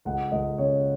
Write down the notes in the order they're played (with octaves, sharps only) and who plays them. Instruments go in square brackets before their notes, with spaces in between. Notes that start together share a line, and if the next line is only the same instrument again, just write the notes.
[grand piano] C#2 [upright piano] F#5
[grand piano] C#2 [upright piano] D#5
[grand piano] C#3 [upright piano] C#5